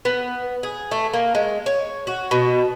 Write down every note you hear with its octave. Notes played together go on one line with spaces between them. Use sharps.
B3
G#4
A3
A#3
G#3
C#5
F#4
B2